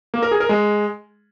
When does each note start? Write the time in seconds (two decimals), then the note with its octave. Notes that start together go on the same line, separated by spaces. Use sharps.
0.14 A#3
0.23 A#4
0.31 G#4
0.40 A#4
0.49 G#3